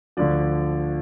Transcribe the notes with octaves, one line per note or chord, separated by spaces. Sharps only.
D2 D3 F3 D5